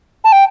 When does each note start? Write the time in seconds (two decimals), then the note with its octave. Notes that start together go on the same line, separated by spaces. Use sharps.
0.24 A5
0.32 G5